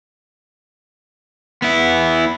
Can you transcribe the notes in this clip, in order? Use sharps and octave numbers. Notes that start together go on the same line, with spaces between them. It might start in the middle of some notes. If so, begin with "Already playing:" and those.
B3 E4